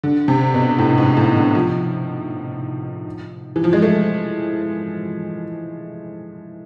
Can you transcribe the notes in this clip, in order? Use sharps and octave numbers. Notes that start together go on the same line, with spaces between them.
D3
C3
B2
A2
G#2
A2
D3
F3
E3
F3
G#3
A3